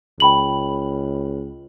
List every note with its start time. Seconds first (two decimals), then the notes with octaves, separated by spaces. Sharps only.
0.20 C#2 G5 B5 F#7